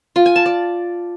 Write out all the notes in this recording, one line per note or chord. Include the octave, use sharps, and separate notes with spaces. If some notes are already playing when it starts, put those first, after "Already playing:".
F4
G#5
A5
D5